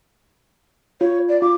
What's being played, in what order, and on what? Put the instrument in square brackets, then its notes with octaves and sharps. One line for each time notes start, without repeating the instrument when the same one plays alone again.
[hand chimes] F4 [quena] C#5
[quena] D5
[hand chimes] F4 [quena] D6